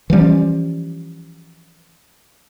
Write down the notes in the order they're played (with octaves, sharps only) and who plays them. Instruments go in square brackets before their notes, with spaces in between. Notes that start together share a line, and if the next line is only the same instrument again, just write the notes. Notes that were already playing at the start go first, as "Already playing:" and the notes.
[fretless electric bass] E3 F3 G3 C#4